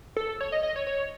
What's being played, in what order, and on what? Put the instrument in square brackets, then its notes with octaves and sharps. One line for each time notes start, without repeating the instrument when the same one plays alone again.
[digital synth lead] A4
C#5
D#5
D#5
C#5
C#5